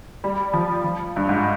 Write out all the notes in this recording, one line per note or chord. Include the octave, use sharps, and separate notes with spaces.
G3
F3
F3
G2
G#2